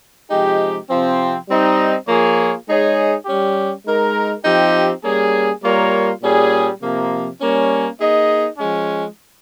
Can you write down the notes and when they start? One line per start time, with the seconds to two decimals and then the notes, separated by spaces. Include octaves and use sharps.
0.30 C3 F3 G#3 D#4 G4
0.90 C3 F3 C4
1.49 G3 C4 D#4
2.08 F3 A#3 F4 G#4 C#5
2.67 G#3 D#4 G#4 C#5
3.26 G3 C#4 G4
3.85 G#3 D#4 A#4
4.45 F3 C4 D#4 G4
5.03 G3 A#3 C#4 G#4
5.63 G3 A#3 F4 A#4 C#5
6.22 A#2 G3 C#4 G#4
6.81 C3 F3 A#3
7.41 G3 A#3 C#4
8.00 A#3 D#4 G#4 D#5
8.59 F3 G#3 C#4